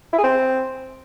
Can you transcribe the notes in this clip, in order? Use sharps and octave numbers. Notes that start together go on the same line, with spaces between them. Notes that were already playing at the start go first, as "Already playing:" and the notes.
E4
G#4
C4